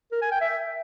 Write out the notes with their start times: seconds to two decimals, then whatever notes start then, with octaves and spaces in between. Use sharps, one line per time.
0.12 A#4
0.22 G#5
0.31 G5
0.41 E5